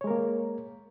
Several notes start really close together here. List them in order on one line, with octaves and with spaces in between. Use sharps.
C#5 G#3 A#4 A#3